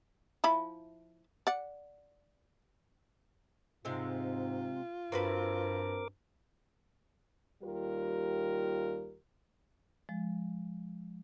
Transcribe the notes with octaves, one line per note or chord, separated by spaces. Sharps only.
F3 E4 B5
D5 F#5
G#2 C3 G#3 C4 F4
G2 C4 F#4 A#4 B4 D6
D#2 G3 F4 G4 A#4
F3 G#3